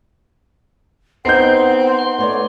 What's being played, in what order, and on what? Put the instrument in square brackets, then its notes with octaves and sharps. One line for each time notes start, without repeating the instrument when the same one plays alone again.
[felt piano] B3 D#4 D#5 [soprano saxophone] C4 [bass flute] F#5 [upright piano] G6 C7
[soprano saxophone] C6
[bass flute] A3 [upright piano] B4 C#5 D5